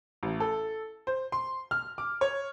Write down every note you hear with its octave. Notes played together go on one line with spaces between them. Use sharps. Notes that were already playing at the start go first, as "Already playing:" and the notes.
A1
A4
C5
C6
F6
D6
C#5